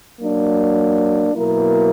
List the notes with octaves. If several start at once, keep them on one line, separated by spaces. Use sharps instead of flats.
F#3 A#3 D4
B2 F#3 A#3 E4 A#4